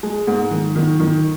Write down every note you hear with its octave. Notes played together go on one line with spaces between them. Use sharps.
G#3
G#2
D#3
D#3
D#3